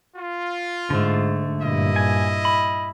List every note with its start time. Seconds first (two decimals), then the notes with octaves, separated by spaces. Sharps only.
0.15 F4
0.90 G#2 D3 A3
1.61 G2 A#2 E4 D#5
1.96 G#5
2.45 B5